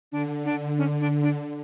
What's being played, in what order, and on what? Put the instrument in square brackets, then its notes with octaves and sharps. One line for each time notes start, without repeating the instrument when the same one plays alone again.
[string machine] D3 [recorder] D4
[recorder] D4
C#4
D4
D4